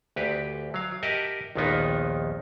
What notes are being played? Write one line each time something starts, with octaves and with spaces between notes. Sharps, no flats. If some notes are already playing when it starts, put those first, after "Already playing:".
D2 G4 B4
F#3 F5
G4 A#4 D#5 E5 F#5 A5
A#1 D#2 D#3 F3 B3 D#4